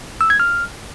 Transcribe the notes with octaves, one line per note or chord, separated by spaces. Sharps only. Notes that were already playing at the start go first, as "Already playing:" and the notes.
E6
G#6
F6